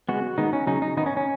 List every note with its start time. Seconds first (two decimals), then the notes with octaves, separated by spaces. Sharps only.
0.09 C#3 G#3 B3 F#4
0.38 D#3 G#3 B3 D#4
0.53 C#4
0.67 C#3 F#3 C#4 D#4
0.82 D#4
0.97 D#3 B3 D#4
1.06 C#4
1.17 C#4